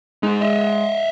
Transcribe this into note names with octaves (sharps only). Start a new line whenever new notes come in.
G#3 D#4 G#4
D#5 E5